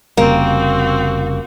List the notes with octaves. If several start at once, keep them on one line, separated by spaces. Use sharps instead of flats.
F1 C#3 G3 A#3 C4 F#4